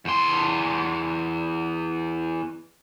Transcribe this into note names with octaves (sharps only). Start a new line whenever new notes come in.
E2 C6